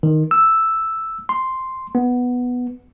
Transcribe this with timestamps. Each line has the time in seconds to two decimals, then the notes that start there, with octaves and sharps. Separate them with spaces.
0.03 D#3
0.31 E6
1.29 C6
1.95 B3